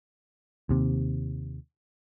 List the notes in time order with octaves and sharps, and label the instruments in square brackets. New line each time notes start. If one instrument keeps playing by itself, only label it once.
[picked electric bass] D#2 C3